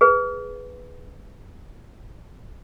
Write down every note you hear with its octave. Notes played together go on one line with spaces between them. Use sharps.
G#4 B4